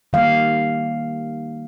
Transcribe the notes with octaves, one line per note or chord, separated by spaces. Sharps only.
D#3 G3 A#3 F5